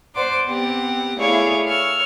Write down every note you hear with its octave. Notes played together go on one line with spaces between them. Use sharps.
C5 D5 F#5 C6 D6
B3 C4 G4 F#5
A3 E4 G#4 C#5 D5 F5
C#5 E6 F6